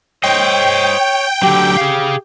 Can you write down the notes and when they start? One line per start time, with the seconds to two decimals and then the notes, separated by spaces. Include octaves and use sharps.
0.23 C5 C#5 D#5 G5
1.42 D3 F#3 G4
1.77 G#4 F5